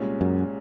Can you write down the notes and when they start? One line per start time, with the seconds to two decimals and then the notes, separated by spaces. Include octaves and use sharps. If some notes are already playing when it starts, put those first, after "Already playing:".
Already playing: C2 A#2 G#3 C#4
0.21 F#2